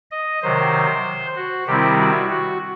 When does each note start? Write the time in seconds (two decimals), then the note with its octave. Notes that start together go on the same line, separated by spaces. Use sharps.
0.11 D#5
0.42 C3 D#3 F#3 C5
1.36 F#4
1.67 C3 D#3 G3 C4 E4 G4
1.98 F#4
2.30 F#4